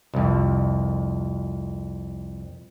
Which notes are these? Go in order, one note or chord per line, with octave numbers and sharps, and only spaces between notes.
C2 F2